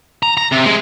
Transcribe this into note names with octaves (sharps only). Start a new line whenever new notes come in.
A#5
A#5
C3
G#3